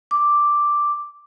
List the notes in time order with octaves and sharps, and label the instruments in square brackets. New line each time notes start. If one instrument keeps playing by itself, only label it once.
[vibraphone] D6